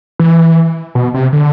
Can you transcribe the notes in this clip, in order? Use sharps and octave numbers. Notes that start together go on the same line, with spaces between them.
E3
B2
C3
D3